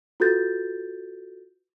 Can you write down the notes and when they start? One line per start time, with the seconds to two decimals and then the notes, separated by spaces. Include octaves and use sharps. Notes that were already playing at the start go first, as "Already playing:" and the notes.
0.20 F4 F#4 A4 B4 G6 A6